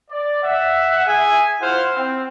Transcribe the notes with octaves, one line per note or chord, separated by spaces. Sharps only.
D5
E5 F#5
G#4 E5 G#5
E4 F4 C5 F5 F#5
C4